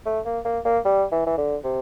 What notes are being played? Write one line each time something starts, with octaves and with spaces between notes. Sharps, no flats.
A3
A#3
A#3
A#3
G3
E3
E3
D3
C3